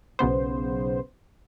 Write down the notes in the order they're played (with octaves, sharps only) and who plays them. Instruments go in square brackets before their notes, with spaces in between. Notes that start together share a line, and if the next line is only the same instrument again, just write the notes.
[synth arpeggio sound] B1 C#3 B3 C5